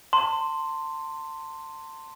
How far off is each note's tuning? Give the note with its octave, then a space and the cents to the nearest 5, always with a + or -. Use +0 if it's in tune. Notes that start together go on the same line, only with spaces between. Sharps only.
A5 +30 C6 +0